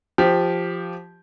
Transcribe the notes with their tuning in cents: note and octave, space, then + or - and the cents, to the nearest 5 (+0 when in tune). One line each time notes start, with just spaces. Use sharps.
F3 -5 G4 +0